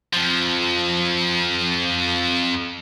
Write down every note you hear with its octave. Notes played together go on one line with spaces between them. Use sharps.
F2 F3